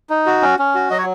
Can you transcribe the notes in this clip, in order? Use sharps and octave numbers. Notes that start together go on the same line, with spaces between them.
D#4
F#4
C#4
C#4
F#4
F#3 D#5
C#5